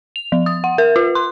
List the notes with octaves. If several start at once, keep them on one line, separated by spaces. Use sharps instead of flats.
F7
F3
D#6
F#5
A#4
F4
C6